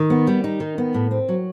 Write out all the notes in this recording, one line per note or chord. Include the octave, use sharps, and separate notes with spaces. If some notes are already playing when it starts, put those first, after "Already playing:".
Already playing: D#3
B3
G3
D#4
D#3
B3
A2
C4
F#3